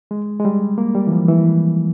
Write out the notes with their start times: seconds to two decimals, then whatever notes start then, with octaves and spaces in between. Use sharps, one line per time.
0.11 G#3
0.40 G#3
0.45 G3
0.78 A#3
0.95 G3
1.07 E3
1.12 F3
1.28 E3